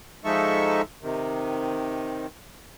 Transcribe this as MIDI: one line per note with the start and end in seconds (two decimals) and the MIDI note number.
0.25 0.82 53
0.25 0.82 56
0.25 0.82 63
0.25 0.82 69
0.25 0.82 76
0.25 0.82 85
1.02 2.26 48
1.02 2.26 51